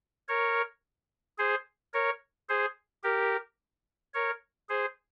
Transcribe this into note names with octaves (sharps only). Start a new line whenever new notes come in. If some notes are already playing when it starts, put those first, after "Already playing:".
A#4 C#5
G#4 C5
A#4 C#5
G#4 C5
G4 A#4
A#4 C#5
G#4 C5